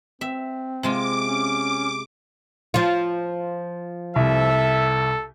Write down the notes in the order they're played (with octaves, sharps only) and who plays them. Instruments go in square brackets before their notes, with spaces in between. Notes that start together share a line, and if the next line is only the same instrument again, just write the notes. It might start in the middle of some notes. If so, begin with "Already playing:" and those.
[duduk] C4 [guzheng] E5
[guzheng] C3 G#3 F4 [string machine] D6
[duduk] C#4
[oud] F3 F4
[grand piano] C2 [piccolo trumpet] A4 [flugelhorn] E5